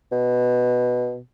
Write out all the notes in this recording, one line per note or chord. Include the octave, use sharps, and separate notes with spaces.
B2